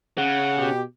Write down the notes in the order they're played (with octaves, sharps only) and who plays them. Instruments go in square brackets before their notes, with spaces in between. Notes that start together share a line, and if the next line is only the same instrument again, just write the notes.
[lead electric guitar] C#3 [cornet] F#5
[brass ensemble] B2 G4